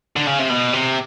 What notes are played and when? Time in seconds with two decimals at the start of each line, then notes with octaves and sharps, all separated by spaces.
0.16 D3
0.27 C#3
0.39 C3
0.49 B2
0.73 C3